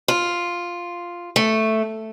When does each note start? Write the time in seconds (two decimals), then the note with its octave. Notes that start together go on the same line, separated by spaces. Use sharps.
0.08 F4
1.36 A3